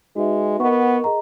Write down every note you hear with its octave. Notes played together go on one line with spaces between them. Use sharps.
G#3 D#4 F#4 B4 E5
B3 A#4 D#5 F#5 C#6
G#4 D#5 A#5